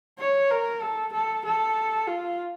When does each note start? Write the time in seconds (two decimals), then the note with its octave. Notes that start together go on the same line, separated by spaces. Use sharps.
0.19 C#5
0.50 A#4
0.81 A4
1.12 A4
1.45 A4
2.07 F4